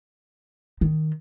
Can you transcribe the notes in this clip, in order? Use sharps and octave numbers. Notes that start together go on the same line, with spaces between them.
D#3